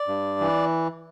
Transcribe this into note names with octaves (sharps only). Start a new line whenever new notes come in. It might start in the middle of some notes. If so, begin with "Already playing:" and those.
Already playing: D5
G2
E3